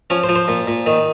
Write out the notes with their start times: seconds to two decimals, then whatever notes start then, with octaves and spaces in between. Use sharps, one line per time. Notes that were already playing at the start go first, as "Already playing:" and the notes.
0.10 F3 C#4
0.23 C5
0.29 F3
0.36 C5
0.48 A#2
0.67 A#2
0.86 D#3